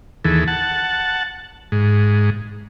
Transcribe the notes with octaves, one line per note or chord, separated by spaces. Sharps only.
D#2 E3 G#4 A4
F#5 A5
G#2